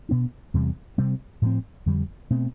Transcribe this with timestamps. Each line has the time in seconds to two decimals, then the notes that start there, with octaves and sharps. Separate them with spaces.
0.09 B2 B3 D4
0.54 E2 C3 G3
0.98 C3 G3 C4
1.42 A2 F3 C4
1.86 F2 D3 G3
2.30 B2 A3 C4